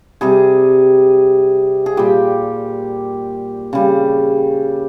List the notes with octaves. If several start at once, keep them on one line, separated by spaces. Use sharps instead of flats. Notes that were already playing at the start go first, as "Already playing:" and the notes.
C3 G3 G#4
G#4
A#2 G3 G4
C#3 G3